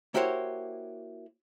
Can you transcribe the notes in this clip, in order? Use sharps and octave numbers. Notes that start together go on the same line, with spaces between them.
A#3 E4 F#4 G4 C5 C#5